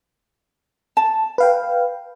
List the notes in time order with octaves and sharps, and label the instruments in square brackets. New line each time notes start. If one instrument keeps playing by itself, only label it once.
[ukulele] A5
[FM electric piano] B4 F5 G5